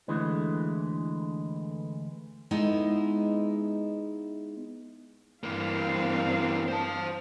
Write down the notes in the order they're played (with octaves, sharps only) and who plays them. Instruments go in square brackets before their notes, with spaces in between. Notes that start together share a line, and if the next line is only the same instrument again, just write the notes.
[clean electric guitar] D2 D3 E3 G#3
[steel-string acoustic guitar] G#3 B3 D#4 E4
[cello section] G2 C4 F5 [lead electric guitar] E3 A#3
[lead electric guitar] C5 A5